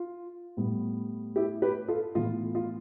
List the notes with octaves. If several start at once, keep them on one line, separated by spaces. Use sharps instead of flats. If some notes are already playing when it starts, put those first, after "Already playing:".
Already playing: F4
A2 G3 B3
E4 G4
G4 B4
F4 A4
A2 E3 B3 F4
F4